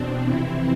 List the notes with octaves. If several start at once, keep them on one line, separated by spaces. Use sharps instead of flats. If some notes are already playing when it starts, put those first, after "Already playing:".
Already playing: E2 B2 C4 D4
F2 C3 E3 C4 E4